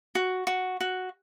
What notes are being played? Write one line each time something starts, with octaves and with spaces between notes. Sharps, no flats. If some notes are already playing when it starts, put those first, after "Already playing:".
F#4
F#4
F#4